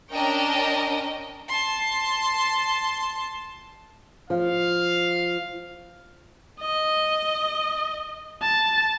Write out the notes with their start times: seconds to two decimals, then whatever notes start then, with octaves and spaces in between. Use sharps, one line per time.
0.12 C#4 D4 A#4 D#5 G5
1.48 A5 C6
4.30 F3 F5
6.60 D#5
8.42 A5